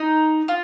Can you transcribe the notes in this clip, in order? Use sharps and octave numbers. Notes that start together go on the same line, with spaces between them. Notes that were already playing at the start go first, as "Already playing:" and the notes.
Already playing: D#4
F4